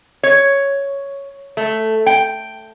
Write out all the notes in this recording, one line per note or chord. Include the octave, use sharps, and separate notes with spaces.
C#5
A3
G5